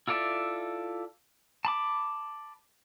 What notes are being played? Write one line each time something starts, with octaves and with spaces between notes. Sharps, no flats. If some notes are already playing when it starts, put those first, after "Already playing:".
E4 F4 A4 D5 E5
A5 B5 D6